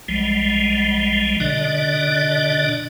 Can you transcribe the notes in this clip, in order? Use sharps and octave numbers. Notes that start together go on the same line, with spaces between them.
B1 F3 G3 G#3
B2 D3 D4 D5 D#5